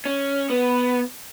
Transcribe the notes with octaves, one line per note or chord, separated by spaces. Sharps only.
C#4
B3